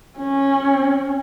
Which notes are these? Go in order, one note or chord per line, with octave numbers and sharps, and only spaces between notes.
C#4